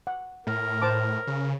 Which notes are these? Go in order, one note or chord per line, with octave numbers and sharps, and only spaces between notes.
F#5
A2 A#4
C5 A5 D6
C#3